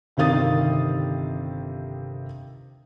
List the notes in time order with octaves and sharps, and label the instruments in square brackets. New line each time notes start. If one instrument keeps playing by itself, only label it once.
[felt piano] G1 C3 D#3 F5 D#6 A6